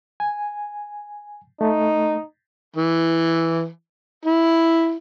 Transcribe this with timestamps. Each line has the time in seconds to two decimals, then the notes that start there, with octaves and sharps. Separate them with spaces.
0.20 G#5
1.61 A3 D#4
2.76 E3
4.25 E4